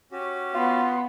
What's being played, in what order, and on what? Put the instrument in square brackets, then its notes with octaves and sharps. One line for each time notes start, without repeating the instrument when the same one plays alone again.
[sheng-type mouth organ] C#4 F#4 G4
[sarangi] B3 [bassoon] F4 [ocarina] C6